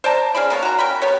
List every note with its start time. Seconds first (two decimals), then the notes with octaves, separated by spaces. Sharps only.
0.04 C5 D5 A5 A#5
0.35 C#4 G#4 D5 B5
0.50 A#3 B3 G#4 C#5
0.63 F#4 A#5
0.79 C#4 A#4 G5 B5
1.02 B3 G4 C#5